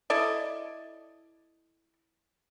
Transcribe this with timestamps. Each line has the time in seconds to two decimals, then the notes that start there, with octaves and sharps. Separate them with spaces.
0.10 E4 A4 D5 D#5